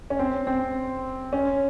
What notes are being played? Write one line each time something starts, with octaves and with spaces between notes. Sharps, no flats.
C#4
C4
C4
C#4